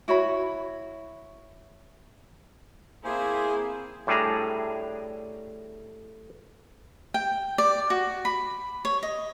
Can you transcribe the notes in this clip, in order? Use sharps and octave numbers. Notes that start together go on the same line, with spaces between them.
E4 F#4 C#5 B5
A#3 C4 E4 G#4 C5 G#5
A2 G3 D4 G#4 A#5
G5
D5
F#4
B5
C#5
D#5